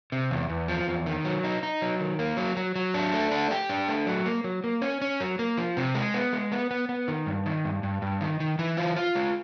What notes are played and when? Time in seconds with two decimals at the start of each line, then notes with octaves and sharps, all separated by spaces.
0.12 C3
0.31 E2
0.50 E2
0.68 F3
0.87 E2
1.06 D#3
1.25 F#3
1.44 D#4
1.63 D#4
1.82 F#3
2.00 D#3
2.19 A#3
2.37 F#3
2.57 F#3
2.76 F#3
2.94 D4
3.13 A3
3.31 D4
3.51 G4
3.69 D4
3.88 A3
4.07 F#3
4.26 A#3
4.44 F#3
4.64 A#3
4.82 C#4
5.02 C#4
5.20 F#3
5.39 A#3
5.58 F3
5.77 C3
5.95 G#3
6.14 B3
6.33 G#3
6.52 B3
6.71 B3
6.89 B3
7.08 D#3
7.26 G2
7.46 D#3
7.64 G2
7.83 G2
8.02 G2
8.21 D#3
8.40 D#3
8.59 E3
8.77 F4
8.96 F4
9.15 G#3